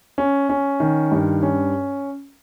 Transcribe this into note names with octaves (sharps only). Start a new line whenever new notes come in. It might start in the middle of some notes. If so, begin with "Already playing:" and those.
C#4
C#4
D#3
G2
C#4